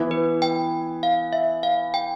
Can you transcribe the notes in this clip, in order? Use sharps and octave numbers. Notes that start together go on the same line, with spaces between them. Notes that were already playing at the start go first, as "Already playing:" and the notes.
Already playing: E3 B3 E4
B4
G5
F5
E5
F5
G5